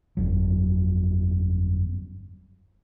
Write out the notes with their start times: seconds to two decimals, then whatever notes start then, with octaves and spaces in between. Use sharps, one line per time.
0.17 G1 F2 F#3